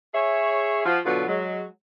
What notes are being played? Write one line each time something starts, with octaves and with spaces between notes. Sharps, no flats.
G#4 C#5 E5
F3 F4 F#4
B2 D3 F#3 F4 F#4 B4
F#3 G#3